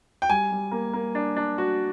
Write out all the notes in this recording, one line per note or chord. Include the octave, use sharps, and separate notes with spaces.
G5
G3 G#5
G3
A#3
A#3
D4
D4
F#4